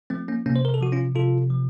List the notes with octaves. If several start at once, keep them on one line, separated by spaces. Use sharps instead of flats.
F3 A3 C4
A#3 C#4
C3 A#3 C#4
C5
A#4
A4
F3 F#4
C#4 F4
C3 F4 A4
F3